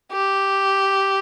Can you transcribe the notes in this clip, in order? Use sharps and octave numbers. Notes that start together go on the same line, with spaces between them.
G4